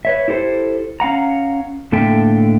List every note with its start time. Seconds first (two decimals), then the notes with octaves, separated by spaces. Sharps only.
0.05 B4 C#5 E5
0.28 E4 G4 A4 C5
1.00 C#4 F5 F#5 A#5
1.92 A2 D3 A#3 A4 E5 G5